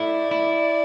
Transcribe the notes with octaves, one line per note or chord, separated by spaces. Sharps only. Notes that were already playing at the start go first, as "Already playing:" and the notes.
Already playing: A3 E4 D5
E4